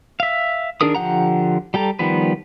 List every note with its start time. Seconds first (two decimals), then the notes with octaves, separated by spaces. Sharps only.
0.20 E5 F5
0.81 D#3 D4 G#4 A#4 D#6
0.95 D3 F3 G4 F#5 A#5
1.74 G3 G4 A4 A#5
1.99 D#3 F3 G3 B3 B4